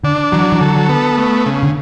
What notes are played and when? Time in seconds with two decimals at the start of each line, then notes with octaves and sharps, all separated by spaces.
0.04 D3 D4
0.32 E3 F#3
0.52 E3
0.61 D3 A4
0.89 B3
1.18 A3
1.46 C#3
1.63 D3